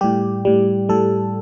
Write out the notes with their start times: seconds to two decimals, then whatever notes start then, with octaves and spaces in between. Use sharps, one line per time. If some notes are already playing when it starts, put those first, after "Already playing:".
0.01 A2 G3 G4
0.45 A2 G3
0.89 A2 G3 A4